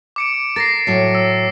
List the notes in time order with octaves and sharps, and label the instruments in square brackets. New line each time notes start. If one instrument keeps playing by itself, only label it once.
[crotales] D6 C#7 D7
[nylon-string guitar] A#4 [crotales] A6 A#6 C7
[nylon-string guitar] A2 F#3
[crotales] E6